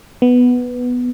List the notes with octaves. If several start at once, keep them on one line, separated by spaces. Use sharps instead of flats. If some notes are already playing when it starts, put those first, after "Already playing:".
B3